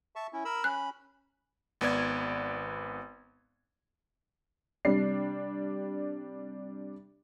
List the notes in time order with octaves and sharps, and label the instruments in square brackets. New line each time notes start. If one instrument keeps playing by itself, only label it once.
[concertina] E5 A5 C#6
C#4 E4
A#4 B5 E6
[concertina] C#4 B5 [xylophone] F#6
[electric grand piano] G#1 B3 D5 G#6
[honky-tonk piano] C3 G3 D4 C7